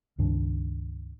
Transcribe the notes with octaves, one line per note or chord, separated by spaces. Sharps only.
C#2 G2 D#3 D4